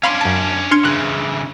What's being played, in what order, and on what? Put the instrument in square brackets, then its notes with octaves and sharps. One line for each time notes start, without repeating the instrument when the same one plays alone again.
[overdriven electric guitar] C#4 D4 [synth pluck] F5 B5 C6
[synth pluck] F#2 A5
[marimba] D4 [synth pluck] C6 F6 G#6
[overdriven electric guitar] C#3 E3 [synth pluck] F#6